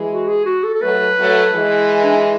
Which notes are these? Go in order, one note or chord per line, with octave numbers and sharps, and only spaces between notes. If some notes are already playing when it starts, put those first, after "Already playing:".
Already playing: E3 G#3
F#4
G#4
F#4
A4
A4
F#3 A3 B4
F#3 A3
E3 G#3
D4
E4